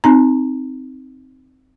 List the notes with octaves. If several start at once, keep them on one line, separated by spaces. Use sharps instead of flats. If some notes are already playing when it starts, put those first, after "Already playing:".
C4 D#4 A#5